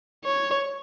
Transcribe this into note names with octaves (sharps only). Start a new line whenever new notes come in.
C#5